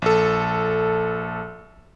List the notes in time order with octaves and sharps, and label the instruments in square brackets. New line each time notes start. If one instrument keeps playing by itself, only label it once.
[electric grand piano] A#1 A4